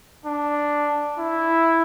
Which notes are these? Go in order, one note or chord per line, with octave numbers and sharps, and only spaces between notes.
D4
E4